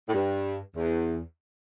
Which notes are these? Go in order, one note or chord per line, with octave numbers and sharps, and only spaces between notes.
A2
G2
E2